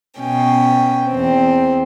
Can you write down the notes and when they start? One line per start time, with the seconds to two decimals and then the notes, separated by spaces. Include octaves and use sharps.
0.20 B2 C#4 G5
1.09 E2 C4